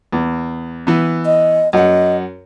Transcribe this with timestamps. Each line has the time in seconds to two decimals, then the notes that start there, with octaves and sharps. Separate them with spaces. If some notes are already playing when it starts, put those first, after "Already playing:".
0.13 E2
0.87 E3 B3
1.26 D#5
1.73 F#2 D#5 F#5